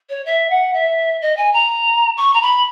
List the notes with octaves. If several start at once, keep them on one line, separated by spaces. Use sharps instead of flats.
C#5
E5
F#5
E5
D#5
G#5
A#5
C#6
A#5
B5